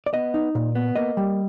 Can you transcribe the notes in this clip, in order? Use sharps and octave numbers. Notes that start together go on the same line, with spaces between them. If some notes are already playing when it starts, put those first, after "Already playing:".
D5
B3 D#5
D#4
A#2
B3
A#3 D#5
G3